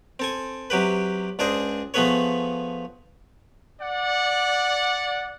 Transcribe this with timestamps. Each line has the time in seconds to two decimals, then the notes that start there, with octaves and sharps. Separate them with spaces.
0.19 C4 A4 G#5
0.70 C3 F#3 G4 B4
1.39 C#2 D4 G#4 C5 D#5
1.94 F3 A3 B3 G#4 B4 C#5
3.81 D5 F#5